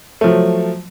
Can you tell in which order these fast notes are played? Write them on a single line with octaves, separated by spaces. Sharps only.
A3 F3 F#3